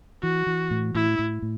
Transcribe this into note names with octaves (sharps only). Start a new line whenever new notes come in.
E3 F#4
E3
A2
A2 E4
A2
A2